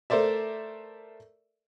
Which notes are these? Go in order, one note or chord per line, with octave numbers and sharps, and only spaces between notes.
A3 A4 A#4 C5 D5 E5